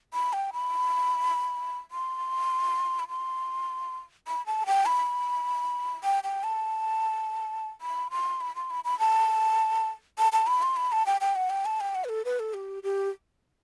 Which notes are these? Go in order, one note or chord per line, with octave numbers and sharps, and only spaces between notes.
B5
G5
B5
C6
B5
C6
B5
A5
G5
B5
G5
G5
A5
B5
C6
B5
C6
B5
B5
A5
A5
A5
B5
C6
B5
A5
G5
G5
F#5
G5
A5
G5
F#5
B4
A4
B4
A4
G4
G4